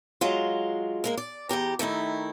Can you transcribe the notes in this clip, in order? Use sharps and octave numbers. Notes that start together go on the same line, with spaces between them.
F#3 G#3 F4
G#3 A#3 A#4
D5
E2 G#2 G4 A#5
D#3 A3 D#4 E4